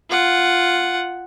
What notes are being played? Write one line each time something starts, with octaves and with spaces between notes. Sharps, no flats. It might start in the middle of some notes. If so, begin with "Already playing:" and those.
F4 F#5